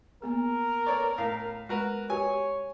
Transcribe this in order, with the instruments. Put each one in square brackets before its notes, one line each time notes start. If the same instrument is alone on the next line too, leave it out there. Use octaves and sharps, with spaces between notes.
[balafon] A#3 B3 G#4 [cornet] A#4
[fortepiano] A4 C#5 D5 [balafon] B4 A#5 C#6
[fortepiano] A2 F5
[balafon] G#3 [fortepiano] F#4 A#4 B4
[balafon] F#4 G4 B4 [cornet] C#5 [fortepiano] G#5